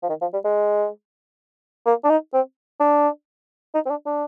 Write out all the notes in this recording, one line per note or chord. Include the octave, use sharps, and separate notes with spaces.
F3
D#3
F3
G3
G#3
A#3
D4
D#4
C4
D4
D#4
C4
D4
D4